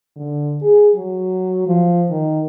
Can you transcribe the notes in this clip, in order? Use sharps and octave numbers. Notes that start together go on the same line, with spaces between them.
D3
G#4
F#3
F3
D#3